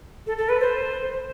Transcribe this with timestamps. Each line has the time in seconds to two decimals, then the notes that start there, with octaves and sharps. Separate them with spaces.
0.27 A4
0.38 A4
0.49 B4
0.60 C5